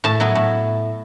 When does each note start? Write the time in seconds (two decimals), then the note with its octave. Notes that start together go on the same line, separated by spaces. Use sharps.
0.04 A2 A5
0.20 F#3 B3 E4
0.35 A2